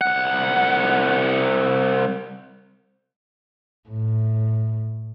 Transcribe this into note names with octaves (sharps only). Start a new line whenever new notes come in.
C2 F#5
A2